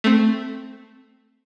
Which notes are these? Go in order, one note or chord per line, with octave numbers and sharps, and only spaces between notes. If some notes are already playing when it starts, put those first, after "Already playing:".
A3 C4